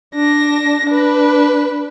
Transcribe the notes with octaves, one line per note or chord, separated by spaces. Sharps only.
D4 A#6
D4 B4